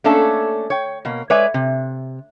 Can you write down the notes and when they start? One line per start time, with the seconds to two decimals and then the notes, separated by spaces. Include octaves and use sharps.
0.04 A3 A#3 C#4 D4 A4 A5
0.70 C#5 G5
1.05 B2 A#3
1.30 G#3 B4 C#5 D5 E5 G#5
1.54 C3